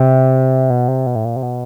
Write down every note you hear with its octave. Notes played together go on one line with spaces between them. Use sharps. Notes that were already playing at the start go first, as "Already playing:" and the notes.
Already playing: C3
B2
C3
B2
A2
A#2
C3
B2